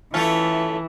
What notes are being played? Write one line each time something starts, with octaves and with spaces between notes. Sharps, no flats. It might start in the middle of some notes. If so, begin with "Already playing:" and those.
E3 A3 C#4 F4